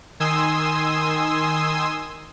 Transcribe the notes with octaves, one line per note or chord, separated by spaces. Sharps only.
D#3 G#5 C6 D#6 E6